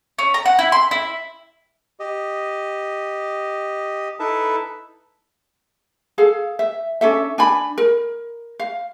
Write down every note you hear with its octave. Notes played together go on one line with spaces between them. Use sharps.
C#4
A#5
F#5
E4
C6
E4
G4 D#5
D#4 E4 A4 B4 E5 A5
G#4 A4 F5
E5
C#4 D4 A4 E5
D4 G#5 B5
A#4
F5